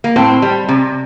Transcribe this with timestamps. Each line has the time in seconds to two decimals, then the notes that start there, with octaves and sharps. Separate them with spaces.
0.04 A#3
0.16 A2 C4
0.42 G3
0.69 C3